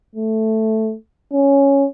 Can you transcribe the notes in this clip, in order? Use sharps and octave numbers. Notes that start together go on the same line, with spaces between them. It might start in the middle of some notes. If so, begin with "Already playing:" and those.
A3
C#4